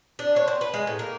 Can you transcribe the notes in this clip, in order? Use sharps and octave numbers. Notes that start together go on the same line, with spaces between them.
D4
C#5
C4
B4
G#3
A2
A#3